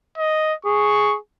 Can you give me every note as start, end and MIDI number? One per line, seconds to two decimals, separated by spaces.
0.18 0.54 75
0.65 1.15 68
0.65 1.16 85